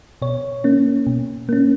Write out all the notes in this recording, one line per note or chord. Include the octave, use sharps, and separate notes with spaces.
B2 C#5
A#3 C#4
B2
A#3 C#4